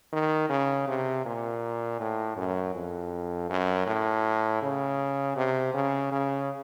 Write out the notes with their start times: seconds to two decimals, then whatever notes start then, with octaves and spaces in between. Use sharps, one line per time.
0.13 D#3
0.50 C#3
0.88 C3
1.26 A#2
2.00 A2
2.37 F#2
2.75 F2
3.50 F#2
3.87 A2
4.62 C#3
5.37 C3
5.74 C#3
6.12 C#3